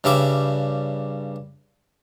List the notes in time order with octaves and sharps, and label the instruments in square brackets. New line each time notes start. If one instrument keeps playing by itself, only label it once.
[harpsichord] G2 C#3 G3 E5 D6